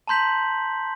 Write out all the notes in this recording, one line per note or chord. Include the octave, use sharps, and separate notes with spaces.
A5 A#5 C6 G6 B6 F#7